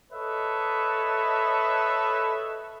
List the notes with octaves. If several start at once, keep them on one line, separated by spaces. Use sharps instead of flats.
A4 B4 C#5 D#5 E5